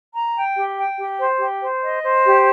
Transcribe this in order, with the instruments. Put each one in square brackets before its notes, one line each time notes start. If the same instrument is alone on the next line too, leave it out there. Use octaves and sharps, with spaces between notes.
[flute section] A#5
G5
G4
G5
G4
C5
G4
C5
D#5
C5
G4